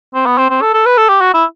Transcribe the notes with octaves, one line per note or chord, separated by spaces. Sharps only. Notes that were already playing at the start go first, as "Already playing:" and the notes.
C4
B3
C4
C4
A4
A4
B4
A4
G4
F#4
E4